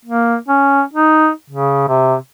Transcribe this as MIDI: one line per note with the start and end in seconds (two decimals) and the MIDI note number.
0.05 0.37 58
0.48 0.82 61
0.93 1.30 63
1.50 1.86 49
1.89 2.15 48